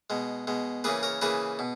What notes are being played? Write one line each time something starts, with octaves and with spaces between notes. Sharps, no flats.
B2 G#3
B2 G#3
C#3 E3 A#3 G#4 B4
A#4 C#5
C#3 E3 A#3 G#4 B4
B2